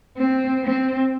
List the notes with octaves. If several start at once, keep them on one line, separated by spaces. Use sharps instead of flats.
C4
C4